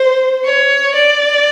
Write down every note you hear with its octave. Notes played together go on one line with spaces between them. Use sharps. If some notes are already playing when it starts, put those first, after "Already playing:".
Already playing: C5
C#5
D5